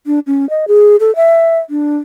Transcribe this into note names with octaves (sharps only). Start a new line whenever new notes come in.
D4
C#4
D#5
G#4
A4
E5
D4